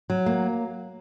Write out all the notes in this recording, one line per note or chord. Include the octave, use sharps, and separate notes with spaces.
F#3
A#3